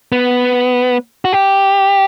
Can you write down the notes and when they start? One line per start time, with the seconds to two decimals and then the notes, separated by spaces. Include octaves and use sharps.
0.12 B3
1.25 F#4
1.33 G4